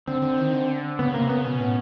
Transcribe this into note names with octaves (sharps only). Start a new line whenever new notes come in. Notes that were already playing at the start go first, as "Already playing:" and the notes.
D3 C4
D3
D#3
D3
C#3 B3
C3 A#3
C#3 B3
B2 B3 C#4
A2